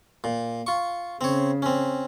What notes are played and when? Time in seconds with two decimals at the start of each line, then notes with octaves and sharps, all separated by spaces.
0.24 A#2
0.67 F4 C#6
1.21 C#3 C4 C#5
1.62 C4 C#4